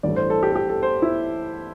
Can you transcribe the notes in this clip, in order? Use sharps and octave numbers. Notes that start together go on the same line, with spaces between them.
A1 G2 E3 A3 D5
C5
A4
G4
A4
G4
A4
C5
E4